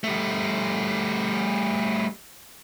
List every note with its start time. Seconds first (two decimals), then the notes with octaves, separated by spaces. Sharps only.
0.04 G3 A3